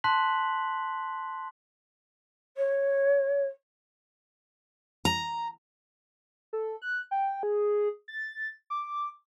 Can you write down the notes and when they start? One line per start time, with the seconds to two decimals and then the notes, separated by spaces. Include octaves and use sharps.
0.04 A5 C6 F#6 B6 F#7
2.57 C#5
5.05 A#5
6.53 A4
6.82 F#6
7.11 G5
7.43 G#4
8.08 A6
8.70 D6